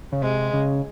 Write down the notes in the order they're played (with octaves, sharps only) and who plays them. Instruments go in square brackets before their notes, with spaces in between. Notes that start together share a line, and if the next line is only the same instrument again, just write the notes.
[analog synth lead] C#3
[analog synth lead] C3 [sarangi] G#3
[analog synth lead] C#3